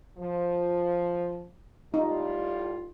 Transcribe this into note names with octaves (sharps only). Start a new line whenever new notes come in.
F3
A2 G3 D#4 F4